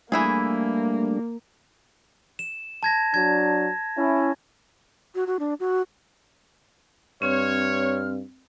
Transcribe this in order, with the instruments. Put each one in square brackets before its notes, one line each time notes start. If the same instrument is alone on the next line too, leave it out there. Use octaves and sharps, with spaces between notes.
[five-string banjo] E3 E4 G#4 [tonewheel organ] G3 A3 D4 [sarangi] A#3
[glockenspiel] E7
A5 G#6 A#6
[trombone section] F#3 D4 [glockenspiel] G#6
[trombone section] C#4 E4
[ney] F#4
F#4
D4
F#4
[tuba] G2 [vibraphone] C4 [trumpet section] C#5 [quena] F6